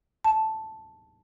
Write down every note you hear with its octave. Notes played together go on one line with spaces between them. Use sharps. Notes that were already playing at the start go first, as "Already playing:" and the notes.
A5